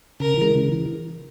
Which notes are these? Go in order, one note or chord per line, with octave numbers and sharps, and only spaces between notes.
C#3 A#4
E3 G#3
C#3
E3